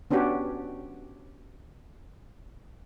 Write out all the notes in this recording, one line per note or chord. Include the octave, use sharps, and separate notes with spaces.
B3 C#4 D4 F#4 G4